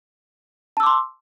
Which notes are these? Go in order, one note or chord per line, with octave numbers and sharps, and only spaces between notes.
A5 C6 D6 E6